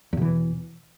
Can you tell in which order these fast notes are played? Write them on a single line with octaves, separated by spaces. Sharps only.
E2 B2 E3